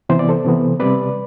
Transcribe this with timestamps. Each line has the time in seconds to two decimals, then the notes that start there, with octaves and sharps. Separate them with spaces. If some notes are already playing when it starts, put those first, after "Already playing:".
0.09 C3 E3 B3 C5
0.19 D5
0.29 A4 C5
0.44 C3 E3 B3
0.79 C3 G3 C4 B4 D5